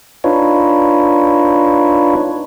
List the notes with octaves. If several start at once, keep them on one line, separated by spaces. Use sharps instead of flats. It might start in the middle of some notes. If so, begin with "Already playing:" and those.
D4 D#4 F4 B4 C#5